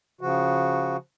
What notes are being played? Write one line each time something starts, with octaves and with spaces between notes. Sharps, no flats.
C#3 F3 F#4